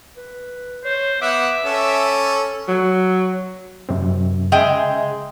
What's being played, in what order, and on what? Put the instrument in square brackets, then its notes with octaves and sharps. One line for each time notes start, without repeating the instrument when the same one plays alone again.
[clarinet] B4
[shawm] C5 [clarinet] C#5
[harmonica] B3 F#5 [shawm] E5 [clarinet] D6
[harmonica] C#4 A4
[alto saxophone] F#3
[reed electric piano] F#2 C3 C4
[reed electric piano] C#3 E5 G#5 [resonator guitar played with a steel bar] G#3 D#5 G5